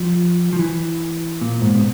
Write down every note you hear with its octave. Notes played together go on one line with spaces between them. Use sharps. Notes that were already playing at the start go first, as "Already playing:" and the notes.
Already playing: F3
F3
E3
A#2
G#2
B2